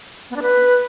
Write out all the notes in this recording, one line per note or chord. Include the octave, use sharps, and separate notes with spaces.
B3
D4
B4